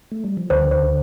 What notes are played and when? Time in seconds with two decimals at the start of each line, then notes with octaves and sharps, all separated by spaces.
0.12 A3
0.24 G3
0.37 F3
0.50 D2 D3 C5
0.71 C5